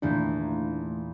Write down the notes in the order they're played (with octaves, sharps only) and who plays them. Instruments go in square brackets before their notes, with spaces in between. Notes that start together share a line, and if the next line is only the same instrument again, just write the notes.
[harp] E2 A#2 D#3 [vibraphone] A3 C6 [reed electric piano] D4